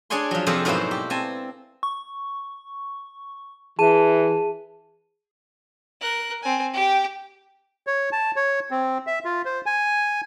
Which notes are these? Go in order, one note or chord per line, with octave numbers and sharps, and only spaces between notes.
D4 G#4 C#5 D5 G#5 C6
F3 F#3
F2 C3 F3 G#4 A4 C5
G#2 B2 F#3 A#3 E4 C5
G4
C4 G#5 A5
C#6
E3 G#4 A5 D#7
A#4 F#6
C4 G#5
G4 G5
C#5
A5
C#5
C4
E5
F4
C5
G#5